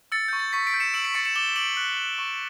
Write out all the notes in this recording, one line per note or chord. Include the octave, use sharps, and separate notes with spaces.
E6 A6 C#7
C#6 G6
A6
C#6 B6
B6 D7
G6
C#7 E7
E6 D7 F#7
B6 D7
C#6 A6 C#7
C#7 E7
D6 E7 G7
D6 D7 F#7
F#6
F#6
C#6